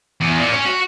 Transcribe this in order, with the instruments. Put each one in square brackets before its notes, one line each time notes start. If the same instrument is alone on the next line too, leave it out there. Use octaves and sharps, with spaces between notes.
[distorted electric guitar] E2
A#2
C#4
F#4